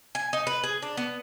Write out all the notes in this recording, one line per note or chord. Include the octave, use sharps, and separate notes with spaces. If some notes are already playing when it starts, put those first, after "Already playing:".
G#5
D#4
B4
G#4
D4
B3